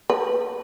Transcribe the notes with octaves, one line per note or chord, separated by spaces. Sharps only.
B4